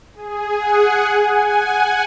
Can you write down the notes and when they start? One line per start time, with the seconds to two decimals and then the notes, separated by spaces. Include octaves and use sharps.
0.15 G#4
0.59 F#5
1.03 G#5
1.46 F#5